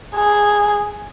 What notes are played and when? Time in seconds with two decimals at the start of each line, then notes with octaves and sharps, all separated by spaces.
0.15 G#4